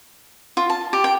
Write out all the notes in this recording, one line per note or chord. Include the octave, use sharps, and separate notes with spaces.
F4
A5
G4
G5